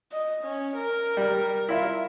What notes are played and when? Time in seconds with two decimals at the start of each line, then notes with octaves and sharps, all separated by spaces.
0.12 D#5
0.44 C#4
0.77 A#4
1.17 G3
1.69 E4 F4 E5